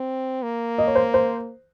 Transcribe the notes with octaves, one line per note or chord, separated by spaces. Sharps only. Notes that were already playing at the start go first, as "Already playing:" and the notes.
Already playing: C4
A#3
D#5
C#5
C5
C5